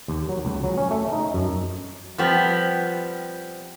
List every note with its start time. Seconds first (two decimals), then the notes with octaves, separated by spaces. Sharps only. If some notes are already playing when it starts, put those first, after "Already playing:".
0.08 D#2
0.29 F#3
0.45 C#2
0.64 F#3
0.77 C#4
0.91 A3
1.12 D#4
1.34 F#2
2.18 F3 G3 B3 C4